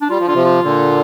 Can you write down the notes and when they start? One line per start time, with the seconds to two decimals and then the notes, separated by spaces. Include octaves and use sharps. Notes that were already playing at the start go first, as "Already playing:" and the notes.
0.01 D4
0.10 G3 F4
0.19 F3
0.26 D3 F4
0.34 C3 F3
0.46 F4
0.62 A#2 D3